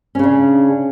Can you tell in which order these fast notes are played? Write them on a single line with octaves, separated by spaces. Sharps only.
C#4 C#3 D4